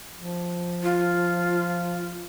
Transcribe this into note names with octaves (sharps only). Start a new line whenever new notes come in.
F3
F4